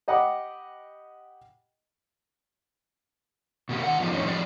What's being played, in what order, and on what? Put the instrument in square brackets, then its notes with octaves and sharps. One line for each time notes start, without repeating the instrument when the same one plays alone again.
[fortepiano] G4 D#5 F#5 G5 B5 D6
[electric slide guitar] B2 A#3 G4
D#3 F#5
F3 B3 D4 D#4 F4 G4
F2 A2 C#4 D#4
F3 G3 C4 D#4 G4 D5